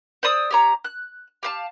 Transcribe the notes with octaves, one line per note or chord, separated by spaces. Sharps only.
C5 D5 D#6 E6
G4 C#5 A#5
F#6
G4 F5 A5